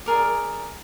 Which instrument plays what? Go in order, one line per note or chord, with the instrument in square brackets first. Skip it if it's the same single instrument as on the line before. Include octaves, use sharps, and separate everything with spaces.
[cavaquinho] G#4 A#4 D5